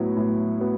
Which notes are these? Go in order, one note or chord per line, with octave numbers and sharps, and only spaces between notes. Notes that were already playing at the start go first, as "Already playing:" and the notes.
Already playing: A2 F#3 B3 E4
A2
F#3 B3